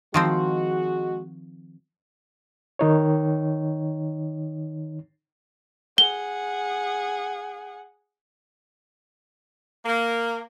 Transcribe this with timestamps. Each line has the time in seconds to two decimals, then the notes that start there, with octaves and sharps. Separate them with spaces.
0.14 D#3 F3 G#3 C4 F#4
2.79 D#3 D#4 C#5
5.98 G#4 F#5 G7
9.86 A#3